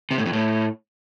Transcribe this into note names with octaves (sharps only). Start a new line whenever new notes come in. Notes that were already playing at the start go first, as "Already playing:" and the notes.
C3
A2
F2
A2